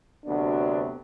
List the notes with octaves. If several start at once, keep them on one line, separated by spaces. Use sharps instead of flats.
D2 C3 F#3 B3 D4